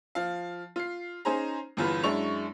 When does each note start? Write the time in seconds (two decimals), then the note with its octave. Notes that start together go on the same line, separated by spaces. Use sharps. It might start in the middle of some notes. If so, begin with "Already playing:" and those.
0.15 F3 F5
0.76 F4 C7
1.25 C#4 D#4 G#4 C5 A#5
1.77 G1 E2 F4 B4
2.04 F#2 G#3 D4 E4 C#6 F7